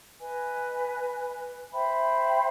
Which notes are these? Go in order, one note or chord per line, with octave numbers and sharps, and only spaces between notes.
B4 D#5 G#5
C5 E5 G5 B5